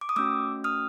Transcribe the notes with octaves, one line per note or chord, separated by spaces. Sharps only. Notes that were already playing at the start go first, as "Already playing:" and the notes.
D6
D#6
A3 C#4 F#4 D6 E6
D#6 F6